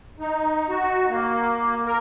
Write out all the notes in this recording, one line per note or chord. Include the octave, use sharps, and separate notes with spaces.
D#4
F#4
A#3
A#4